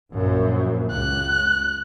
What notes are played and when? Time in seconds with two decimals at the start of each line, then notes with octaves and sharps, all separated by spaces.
0.11 A#1 F#2
0.90 C#2 F#6